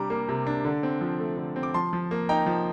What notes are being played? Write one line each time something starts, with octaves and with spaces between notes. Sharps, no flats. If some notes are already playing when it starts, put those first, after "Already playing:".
Already playing: C3 G3 D4 A#5 D6
A#3
C3
D4
D3
C4
F3
A3
D3
C4
D6
F3 A5 C6
F3
A#3
D#4 G5 A#5
F3